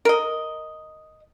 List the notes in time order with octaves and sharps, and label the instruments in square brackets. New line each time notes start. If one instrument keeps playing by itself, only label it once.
[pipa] A#4 D#5